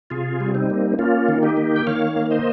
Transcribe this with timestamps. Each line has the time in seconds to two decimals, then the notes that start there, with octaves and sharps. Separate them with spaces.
0.10 C3 F4 G#4
0.40 G3
0.55 C4 D#4
0.70 A#3
0.99 A#3 C#4 F4
1.28 D#3
1.43 D#4 G4
1.57 A#3
1.76 G5
1.87 D#3 C#5 F5
2.16 A#3
2.31 C5 D#5